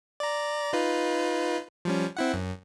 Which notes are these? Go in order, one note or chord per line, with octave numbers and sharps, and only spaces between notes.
D5 A#5
D#4 F4 B4
F3 G3 C#4
C4 E4 F#5
F#2